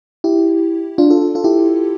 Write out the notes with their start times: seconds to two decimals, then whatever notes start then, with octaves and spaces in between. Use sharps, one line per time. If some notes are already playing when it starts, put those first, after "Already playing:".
0.24 E4 G4
0.98 D4 F4
1.10 F4 A4
1.35 F4 A4
1.44 E4 G4